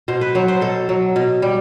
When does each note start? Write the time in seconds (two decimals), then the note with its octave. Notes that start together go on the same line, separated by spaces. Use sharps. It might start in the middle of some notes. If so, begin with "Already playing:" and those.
0.08 B2 C5
0.21 B4
0.35 F#3 C5
0.48 C5
0.61 B2 A4
0.89 F#3
1.16 B2
1.42 G3